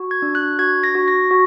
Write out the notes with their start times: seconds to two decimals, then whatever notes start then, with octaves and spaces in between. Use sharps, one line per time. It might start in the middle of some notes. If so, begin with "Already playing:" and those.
Already playing: F#4
0.11 G#6
0.22 D4
0.35 F#6
0.59 F#4 G#6
0.83 A#6
0.95 F#4
1.08 A#6
1.31 F#4